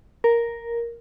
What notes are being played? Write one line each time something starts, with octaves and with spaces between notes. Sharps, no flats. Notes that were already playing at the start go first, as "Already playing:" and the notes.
A#4